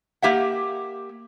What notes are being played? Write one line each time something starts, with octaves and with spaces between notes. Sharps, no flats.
A#3 G4 E5 F#5